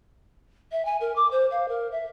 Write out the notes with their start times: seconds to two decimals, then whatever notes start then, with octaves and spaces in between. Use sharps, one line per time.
0.71 E5
0.85 G#5
1.00 A#4
1.16 D6
1.31 C5
1.51 F5
1.68 A#4
1.91 E5